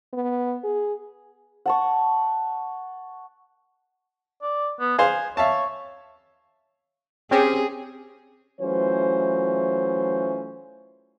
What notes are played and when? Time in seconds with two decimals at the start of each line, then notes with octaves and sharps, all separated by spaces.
0.13 B3
0.64 G#4
1.66 F#5 A5 C#6
4.42 D5
4.80 B3
4.99 G#4 C5 F5 G#5
5.37 C#5 E5 F5 A5
7.31 C4 C#4 G4 G#4
8.60 E3 F#3 A3 C#4 F4 C5